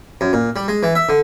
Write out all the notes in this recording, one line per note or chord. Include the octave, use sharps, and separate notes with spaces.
F#2
A#2
G3
G#3
E3
E5
D3